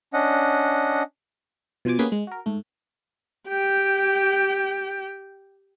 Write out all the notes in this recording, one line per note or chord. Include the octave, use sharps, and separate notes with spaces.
C#4 D4 D#5 F#5
B2 F3 C5 G#5 D6
A#3 B3 C#4 G4 G#4 B4
G#3
F#4 A#4
G#2 A3
G4 G5